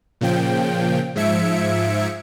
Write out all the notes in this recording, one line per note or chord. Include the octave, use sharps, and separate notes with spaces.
A#2 C#3 F3 G5
G#2 F3 E5 G#6 C#7 D7